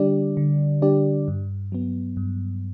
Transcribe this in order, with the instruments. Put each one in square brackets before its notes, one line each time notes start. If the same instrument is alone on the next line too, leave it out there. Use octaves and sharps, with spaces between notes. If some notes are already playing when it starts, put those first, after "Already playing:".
Already playing: [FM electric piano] D3 G3 D4 G4 D5
D3
G3 D4 G4 D5
G2
F#3 B3
G2